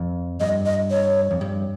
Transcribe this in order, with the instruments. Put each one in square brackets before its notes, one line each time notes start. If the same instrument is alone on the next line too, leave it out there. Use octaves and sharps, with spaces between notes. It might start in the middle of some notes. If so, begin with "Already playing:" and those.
Already playing: [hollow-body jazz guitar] F2
[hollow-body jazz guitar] G2 [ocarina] D#5
[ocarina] D#5
C#5
[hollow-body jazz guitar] F2
G2